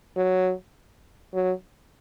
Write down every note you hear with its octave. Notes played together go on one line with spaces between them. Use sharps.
F#3
F#3